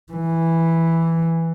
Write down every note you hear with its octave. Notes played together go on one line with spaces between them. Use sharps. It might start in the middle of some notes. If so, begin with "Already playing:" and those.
E3